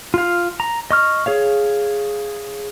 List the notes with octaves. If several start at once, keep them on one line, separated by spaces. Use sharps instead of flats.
F4 F5
A#5
D#5 C#6 F6
G#4 C#5 F5